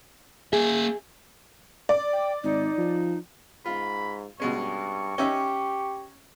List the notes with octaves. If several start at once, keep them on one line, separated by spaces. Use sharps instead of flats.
A#3 G#4 E5
D5
G5
G#1 D#4
F3
G#2 F4 B5
G2 B2 G#3 C#4 C#6
C#4 D#4 G4 E5